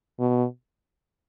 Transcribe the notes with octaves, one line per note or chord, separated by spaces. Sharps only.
B2